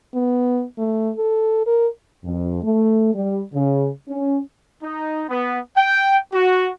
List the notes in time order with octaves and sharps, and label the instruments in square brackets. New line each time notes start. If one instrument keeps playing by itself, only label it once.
[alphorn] B3
A3
A4
A#4
[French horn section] F2
A3
G3
C#3
C#4
[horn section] D#4
B3
G5
F#4